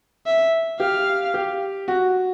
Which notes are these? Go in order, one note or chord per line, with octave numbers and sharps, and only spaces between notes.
E5
G4 F5
G4
F#4